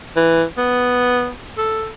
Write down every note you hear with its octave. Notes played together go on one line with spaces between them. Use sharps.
E3
B3
A4